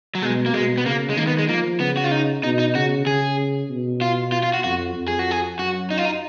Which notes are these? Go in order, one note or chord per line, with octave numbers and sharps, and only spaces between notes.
F#3
B2 G#3
A#3
B2 G#3
B3
C#3 A#3
G#3
D#3 A#3
B3
G#3
F3 A#3
C#3 B3
F#4
F4
D#4
B2 D#4
D#4
C#3 F#4
C#3 G#4
B2
F4
F4
F4
F#4
F2 F#4
F2
G#4
F#4
G#4
F#2 F#4
D#4
F4
D#4